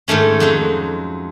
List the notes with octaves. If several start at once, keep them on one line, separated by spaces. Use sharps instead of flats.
G#2 D#3 A3 C#4
F2 F#3 G#3 D#4